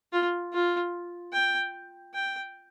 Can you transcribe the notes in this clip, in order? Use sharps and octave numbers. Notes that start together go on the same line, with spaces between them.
F4
F4
G5
G5